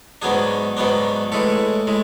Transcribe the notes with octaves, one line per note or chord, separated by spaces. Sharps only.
G#2 D#3 F#3 B3 D4 G#4
G#2 D#3 F#3 B3 D4
A2 E3 G#3 A4
A2 G#3